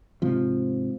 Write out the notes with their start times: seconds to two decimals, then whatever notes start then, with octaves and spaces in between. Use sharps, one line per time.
0.22 G#2 C3 F3